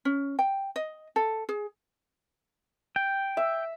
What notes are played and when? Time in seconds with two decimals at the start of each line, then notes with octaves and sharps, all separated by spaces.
0.05 C#4
0.39 G5
0.76 D#5
1.16 A4
1.49 G#4
2.96 G5
3.37 E5